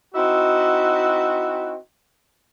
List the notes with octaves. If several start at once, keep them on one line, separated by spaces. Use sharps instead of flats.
C4 D#4 E4 F#4